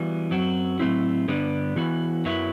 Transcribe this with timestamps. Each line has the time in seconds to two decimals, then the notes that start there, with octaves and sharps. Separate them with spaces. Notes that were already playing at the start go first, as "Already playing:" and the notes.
Already playing: E3 G3 B3 F#4
0.31 F#2 F#3 C4 F#4
0.79 A2 F#3 A3 C4 E4
1.28 G2 D3 G3 B3 D4
1.76 E3 B3 F#4
2.25 F#2 F#3 B3 E4